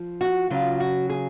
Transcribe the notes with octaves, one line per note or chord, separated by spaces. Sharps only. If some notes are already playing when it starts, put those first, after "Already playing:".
Already playing: F3
F#4
C#3 F#3 F4
F#4
G#4